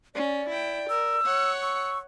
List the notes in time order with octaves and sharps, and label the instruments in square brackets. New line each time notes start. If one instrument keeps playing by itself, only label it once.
[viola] C#4 [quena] D5
[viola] E4 G5
[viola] A#4 [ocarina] E6
[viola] C#5 F#5
[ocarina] C#6 [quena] E6